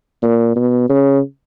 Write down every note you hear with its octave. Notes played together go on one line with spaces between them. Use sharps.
A#2
B2
C#3